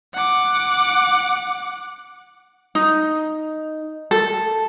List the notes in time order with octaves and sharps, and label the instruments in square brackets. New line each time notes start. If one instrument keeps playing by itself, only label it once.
[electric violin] F#5 D6
[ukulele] D#4
A4